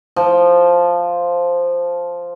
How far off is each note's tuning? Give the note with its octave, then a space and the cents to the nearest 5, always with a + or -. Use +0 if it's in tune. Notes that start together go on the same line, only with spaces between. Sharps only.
F3 +0 G5 +10